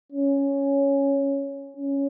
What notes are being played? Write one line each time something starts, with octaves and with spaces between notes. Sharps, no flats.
C#4
C#4